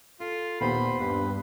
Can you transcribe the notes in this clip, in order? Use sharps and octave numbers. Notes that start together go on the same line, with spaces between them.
F4 A4
D#2 A#2 B3 C5 B5
G2 B4